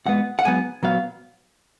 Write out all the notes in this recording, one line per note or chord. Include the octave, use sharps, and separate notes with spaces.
A#2 G#3 B3 F#5
F#5
G#2 F#3 B3 G#5
A#2 F#3 B3 F5